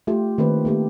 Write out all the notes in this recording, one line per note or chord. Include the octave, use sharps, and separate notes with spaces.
A3 F4 G4
D#3 A3 A#3 C4 D4 B4
A3 A#3 G4